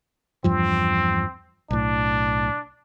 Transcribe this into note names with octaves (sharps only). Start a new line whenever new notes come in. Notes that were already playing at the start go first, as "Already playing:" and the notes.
E2 G2 F3 C4
B1 A2 D4